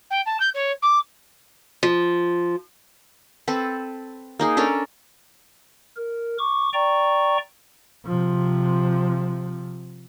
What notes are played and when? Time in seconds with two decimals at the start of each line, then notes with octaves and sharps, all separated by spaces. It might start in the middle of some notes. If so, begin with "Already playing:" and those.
0.10 G5
0.26 A5
0.40 G6
0.54 C#5
0.82 D6
1.83 F3
3.48 C4 A4 B4
4.39 A#3 D#4 G#4
4.57 C#4 D4 A4 A#4
5.97 A#4
6.39 C#6 D6
6.73 D5 G5 A#5 C#6
8.06 C3 F3